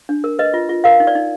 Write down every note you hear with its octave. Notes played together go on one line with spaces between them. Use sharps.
D4
A#4
B4 D#5
F4
F4
A#4 F5
D#4
D5
D#4